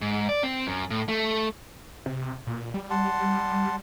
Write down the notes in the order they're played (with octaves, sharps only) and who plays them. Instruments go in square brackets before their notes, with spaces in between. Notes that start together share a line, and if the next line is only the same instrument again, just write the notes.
[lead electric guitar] G#2
D5
C4
F#2
A2
A3
[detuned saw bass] C3
A#2
G3
[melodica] F#5 A5 C6